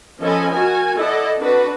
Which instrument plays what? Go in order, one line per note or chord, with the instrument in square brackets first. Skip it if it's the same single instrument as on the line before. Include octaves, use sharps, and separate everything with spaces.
[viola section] F3 C#4 A4 D#5 G#5 B5
F#4 A#4 G#5
E4 A4 D5 D#5 F#5
C4 D4 F#4 B4